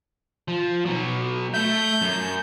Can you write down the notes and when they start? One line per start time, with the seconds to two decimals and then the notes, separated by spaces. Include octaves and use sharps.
0.48 F3
0.86 B2 F#3
1.54 A3 E5 G6
2.02 F#2